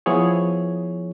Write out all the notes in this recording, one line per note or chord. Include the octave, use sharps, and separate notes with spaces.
F3 B3 E4 G#4 C#5